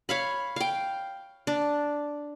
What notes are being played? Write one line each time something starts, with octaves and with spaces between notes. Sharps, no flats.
C#5 F5 B5
F5 G5
D4